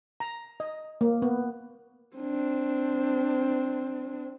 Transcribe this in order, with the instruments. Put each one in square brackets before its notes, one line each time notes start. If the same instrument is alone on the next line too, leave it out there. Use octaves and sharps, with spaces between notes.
[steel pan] A#5
D#5
A#3
B3
[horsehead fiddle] C4 D4